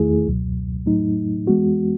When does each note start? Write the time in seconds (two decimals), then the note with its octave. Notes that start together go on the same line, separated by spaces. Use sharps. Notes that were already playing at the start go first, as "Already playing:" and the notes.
Already playing: E2 D#3 A3 E4 G#4
0.27 C#2 B2 F#3
0.86 A2 F#3 A3 D#4
1.47 E3 G#3 B3 F#4